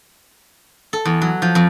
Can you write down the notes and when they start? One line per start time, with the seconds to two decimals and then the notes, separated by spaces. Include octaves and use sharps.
0.93 A4
1.05 E2
1.22 F#3
1.42 F3
1.55 F2